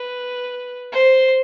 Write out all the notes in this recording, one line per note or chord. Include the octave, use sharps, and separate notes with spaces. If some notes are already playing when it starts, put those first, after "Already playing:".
Already playing: B4
C5